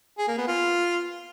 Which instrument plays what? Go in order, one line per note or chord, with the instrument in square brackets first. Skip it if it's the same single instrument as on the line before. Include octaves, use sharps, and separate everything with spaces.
[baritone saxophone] G#4
A#3
B3
F4